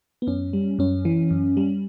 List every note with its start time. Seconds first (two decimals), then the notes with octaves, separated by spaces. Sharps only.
0.22 B3
0.27 F#2 C#4
0.53 G3
0.79 F#2 C#4
1.05 E3
1.31 F#2
1.57 G3